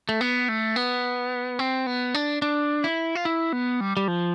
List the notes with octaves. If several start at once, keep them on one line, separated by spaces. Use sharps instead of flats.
A3
B3
A3
B3
C4
B3
D4
D4
E4
F4
E4
B3
G3
G3
F3